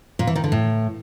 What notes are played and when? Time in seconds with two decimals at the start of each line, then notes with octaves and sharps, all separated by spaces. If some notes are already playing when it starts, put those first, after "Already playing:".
0.19 A#2
0.27 E3
0.36 D#3
0.44 D3
0.52 A2